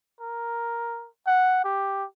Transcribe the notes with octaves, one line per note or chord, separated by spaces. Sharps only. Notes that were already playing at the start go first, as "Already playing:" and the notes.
A#4
F#5
G4